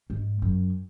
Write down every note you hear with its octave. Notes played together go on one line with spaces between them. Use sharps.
G#2
F#2